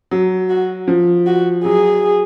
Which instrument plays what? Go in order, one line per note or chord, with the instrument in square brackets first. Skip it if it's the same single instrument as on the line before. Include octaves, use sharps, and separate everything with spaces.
[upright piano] F#3
[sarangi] F#4
[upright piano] F3
[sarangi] F#4
[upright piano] F#3 [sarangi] G#4